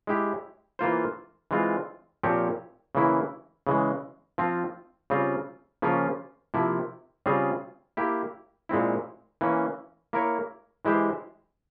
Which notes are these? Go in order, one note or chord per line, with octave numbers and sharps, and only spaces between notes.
G#3 E4 G4
E3 A#3 F4 C5
E3 G#3 C4 F4
A#2 F3 C4 G4 C#5
C#3 E3 A#3 E4
C#3 E3 G#3
F3 C4 F4
C#3 G3 C4 F4
C#3 F3 A#3 C#4 F4
C3 F3 A#3 E4
C#3 G3 C4 F4 G#4
A#3 E4 G4
A#2 G#3 C4 E4
E3 A#3 C#4
A#3 E4 A#4 C#5
E3 G#3 E4 G4 C5